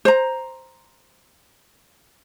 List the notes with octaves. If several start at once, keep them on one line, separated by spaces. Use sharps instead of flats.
C5 A#5